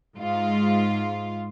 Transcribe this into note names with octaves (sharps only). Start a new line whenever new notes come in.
G#2 F4